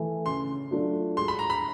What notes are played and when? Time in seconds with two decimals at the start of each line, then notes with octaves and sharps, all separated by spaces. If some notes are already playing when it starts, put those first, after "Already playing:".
Already playing: E3 A3
0.26 C#3 C6
0.71 F#3 A3 D4 F4
1.17 G#3 C6
1.28 B5
1.39 A#5
1.50 B5